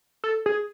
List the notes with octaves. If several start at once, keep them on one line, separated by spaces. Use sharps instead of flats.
A4
G#4